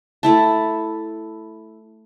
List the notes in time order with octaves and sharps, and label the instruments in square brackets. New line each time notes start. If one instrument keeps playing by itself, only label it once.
[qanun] A3 E4 A5